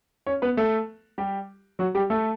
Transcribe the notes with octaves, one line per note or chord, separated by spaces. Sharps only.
C#4 C#5
B3 B4
A3 A4
G3 G4
F#3 F#4
G3 G4
A3 A4